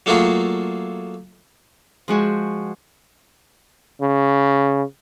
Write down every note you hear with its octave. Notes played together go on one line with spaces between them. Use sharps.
F#3 A3 A#3 F4 F#4 G#4
F3 G#3 F#4 G#5
C#3